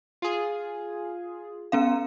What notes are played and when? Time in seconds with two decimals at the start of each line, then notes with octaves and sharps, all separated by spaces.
0.22 F4 G#4
1.72 B3 C#4 F5